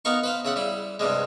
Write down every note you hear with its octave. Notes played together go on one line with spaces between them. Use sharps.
B3 D#4 A#4 F5 C#6
B4 C5 F5
C#3 E5 F#5
G3 E4
G2 C3 G3 G#3